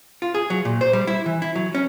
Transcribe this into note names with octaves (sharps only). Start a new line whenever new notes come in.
F4
G#4
F#3
A#2
C5
G3
E4
E3
E4
F#3
C#4